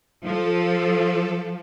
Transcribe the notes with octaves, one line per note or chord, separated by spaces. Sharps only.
F3 A4